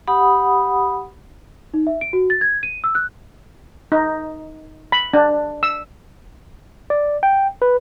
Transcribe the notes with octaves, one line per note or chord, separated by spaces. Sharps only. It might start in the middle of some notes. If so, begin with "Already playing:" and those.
G4 F#5 B5 D#6
D#4
E5
D7
F#4
A6
G#6
D#7
E6
F#6
D#4
B5
D4
E6
D5
G5
B4